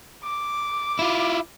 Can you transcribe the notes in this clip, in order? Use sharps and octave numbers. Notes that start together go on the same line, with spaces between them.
D6
E4 F4